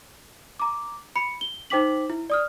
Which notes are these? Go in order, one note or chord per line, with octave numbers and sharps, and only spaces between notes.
A#5 D6
B5 C#7
G7
D#4 C5 G5 D6 B6 F#7
E4
D5 D#6 F6